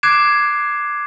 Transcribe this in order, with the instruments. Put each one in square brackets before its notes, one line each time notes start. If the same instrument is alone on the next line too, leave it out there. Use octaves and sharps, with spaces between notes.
[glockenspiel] D6 F#6 G#6 C7 D7 E7